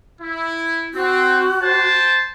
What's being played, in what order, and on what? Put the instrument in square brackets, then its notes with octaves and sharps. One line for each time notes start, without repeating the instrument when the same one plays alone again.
[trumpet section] E4
[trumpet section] C4 [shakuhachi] F#4
[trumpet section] C5 G5 A5